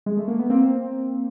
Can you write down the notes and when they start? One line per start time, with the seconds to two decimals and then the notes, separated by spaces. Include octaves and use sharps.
0.06 G#3
0.17 A3
0.28 A#3
0.39 B3
0.50 A#3 C4